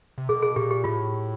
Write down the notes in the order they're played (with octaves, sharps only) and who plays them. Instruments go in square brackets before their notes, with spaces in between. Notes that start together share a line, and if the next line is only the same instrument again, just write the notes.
[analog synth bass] C3
[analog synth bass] B2 [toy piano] G#4
[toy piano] G#4
[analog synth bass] A#2 [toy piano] G4
[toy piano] G4
[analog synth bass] A2 [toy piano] F4